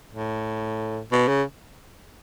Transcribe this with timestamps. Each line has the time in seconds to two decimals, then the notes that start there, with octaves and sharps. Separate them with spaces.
0.12 A2
1.12 B2
1.28 C#3